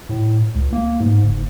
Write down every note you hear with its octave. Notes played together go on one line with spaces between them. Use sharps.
A2
C#2
A#3
G#2
F#1